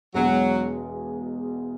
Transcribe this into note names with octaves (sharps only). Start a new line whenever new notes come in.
E1 E2 B2 F#3 G#3